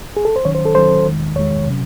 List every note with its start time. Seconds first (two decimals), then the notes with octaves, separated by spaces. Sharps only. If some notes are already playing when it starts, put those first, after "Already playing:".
0.17 G#4
0.25 A4
0.36 C5
0.45 D#3 F#3 C#4 C#5
0.55 C5
0.65 A4
0.75 D#3 F#3 C#4 C5
1.05 E2 D#3 G#3
1.36 E2 D#3 G#3 C#5
1.67 C3 F#3 C#4